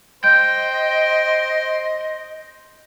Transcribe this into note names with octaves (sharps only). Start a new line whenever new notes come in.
C5 D#5 G5 G6